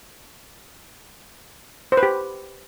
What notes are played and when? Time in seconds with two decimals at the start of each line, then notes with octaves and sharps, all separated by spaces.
1.92 C5
1.97 B4
2.03 G4